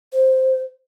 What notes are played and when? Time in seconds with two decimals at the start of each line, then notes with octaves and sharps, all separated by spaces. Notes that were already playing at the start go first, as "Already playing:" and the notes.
0.13 C5